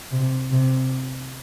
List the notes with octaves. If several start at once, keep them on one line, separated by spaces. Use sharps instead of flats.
C3
C3